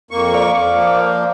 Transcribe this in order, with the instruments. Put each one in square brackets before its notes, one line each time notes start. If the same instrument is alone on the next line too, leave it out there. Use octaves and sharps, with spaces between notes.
[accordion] F2 A#3 C#6
[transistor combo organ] D5 F5
[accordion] F3 A#3